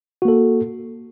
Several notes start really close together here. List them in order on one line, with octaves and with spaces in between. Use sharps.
F#4 A#3 A4